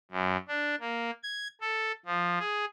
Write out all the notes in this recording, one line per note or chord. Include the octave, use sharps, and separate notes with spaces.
F#2
D4
A#3
G#6
A4
F3
G#4